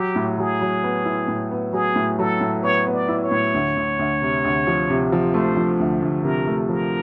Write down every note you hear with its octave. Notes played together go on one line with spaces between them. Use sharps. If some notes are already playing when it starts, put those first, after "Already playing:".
Already playing: F#3 G4
A2
F#3 G#4
F#3
B3
E4
A2
B3
F#3 G#4
A2
F#3 A4
A2
B3 C#5
B3
D5
E4
C#5
A2
D2
D2
D2
C3
D2
F3
C3
F3
A3 C5
F3
D2
D2
C3 A#4
A3
F3 A#4